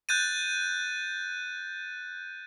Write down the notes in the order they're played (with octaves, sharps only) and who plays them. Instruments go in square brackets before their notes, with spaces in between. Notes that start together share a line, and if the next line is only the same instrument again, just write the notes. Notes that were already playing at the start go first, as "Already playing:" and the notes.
[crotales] F#6 G6 A6 D#7